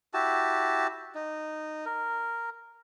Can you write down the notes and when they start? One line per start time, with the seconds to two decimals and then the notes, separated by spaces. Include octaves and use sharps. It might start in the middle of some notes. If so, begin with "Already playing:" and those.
0.14 E4 F#4 G4 A5
1.15 D#4
1.86 A#4